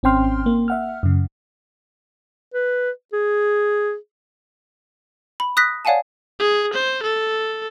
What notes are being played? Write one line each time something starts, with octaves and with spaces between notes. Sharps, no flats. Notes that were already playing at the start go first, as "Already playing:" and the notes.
G#1 C4 C#4 G5 C6 F6
A#3
E5 F#5 F6
F#2 C#3
B4
G#4
B5
D#6 F#6 A#6 B6
C#5 D5 F5 F#5 G#5 A5
G#4
C5
A4